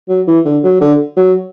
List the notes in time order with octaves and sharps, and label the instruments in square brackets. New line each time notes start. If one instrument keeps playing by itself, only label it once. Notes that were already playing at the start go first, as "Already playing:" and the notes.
[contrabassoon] F#3
E3
D3
F#3
D3
F#3